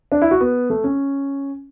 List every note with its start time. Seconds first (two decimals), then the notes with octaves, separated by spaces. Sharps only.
0.12 D4
0.22 E4
0.31 F#4
0.41 B3
0.70 A3
0.84 C#4